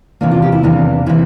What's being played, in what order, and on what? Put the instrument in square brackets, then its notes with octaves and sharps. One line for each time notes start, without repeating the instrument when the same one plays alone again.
[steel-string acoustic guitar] E2 C3 E3 A#3 D4
F4
G4
E4
E2 C3 E3 A#3 D4
C3 E3 A#3 E4